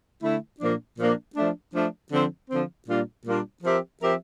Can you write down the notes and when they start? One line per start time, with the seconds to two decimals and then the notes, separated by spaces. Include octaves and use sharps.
0.22 D3 A3 E4
0.60 A#2 F3 A#3 D4
0.97 A#2 F3 A#3 D4
1.35 F3 A3 D4
1.73 F3 A3 D4
2.11 D3 F3 C4
2.48 D3 F3 C4
2.87 A#2 G3 A#3 D4 F4
3.24 A#2 G3 A#3 D4 F4
3.62 F3 C4 G4 A#4 E5
4.00 F3 C4 G4 A#4 E5